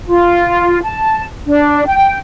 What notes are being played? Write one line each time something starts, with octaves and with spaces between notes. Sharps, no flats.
F4
A5
D4
G5